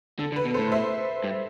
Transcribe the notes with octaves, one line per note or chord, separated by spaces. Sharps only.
D3 A4
D3
B4
B2
A2 A4 C5
C5 E5
G2